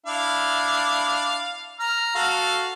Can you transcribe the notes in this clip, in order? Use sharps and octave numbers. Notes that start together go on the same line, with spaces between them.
D4 E4 F5
A#5 F6
F#4 A4 F5